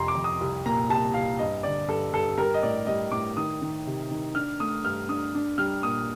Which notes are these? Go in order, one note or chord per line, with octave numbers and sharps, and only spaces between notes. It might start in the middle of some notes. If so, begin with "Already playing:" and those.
Already playing: F1 F2 C3 A#5 C6
D6
F2
D#6
C2
A#2 A#5
C2 A5
C2 F5
G2 D#5
D3 D5
G2 A4
G2 A4
G3 A#4
D#5
A2 D5
G3 D#5
A2 D6
D#3 D#6
D#3
C3
D#3
D4 F6
A3 D#6
G2 F6
D4 D#6
D4
G3 F6
A#2 D#6